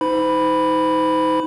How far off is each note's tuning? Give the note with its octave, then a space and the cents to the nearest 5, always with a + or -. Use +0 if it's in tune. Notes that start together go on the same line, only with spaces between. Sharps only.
D#4 +25 C5 -40 B5 +0